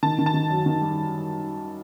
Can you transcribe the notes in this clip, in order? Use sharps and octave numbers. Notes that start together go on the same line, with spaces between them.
D#3 A5
D#3
A5
D#3
F#2
D#3
G3